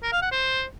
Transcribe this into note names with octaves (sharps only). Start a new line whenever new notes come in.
A#4
F5
F#5
C5